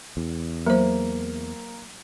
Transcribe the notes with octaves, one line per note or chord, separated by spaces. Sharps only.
E2
F#3 A#3 C5